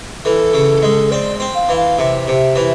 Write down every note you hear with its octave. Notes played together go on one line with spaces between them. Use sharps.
E3 A4
C#3
G#3
C4 D5
C4
F5
E3
F5
C3 E5
C3
E3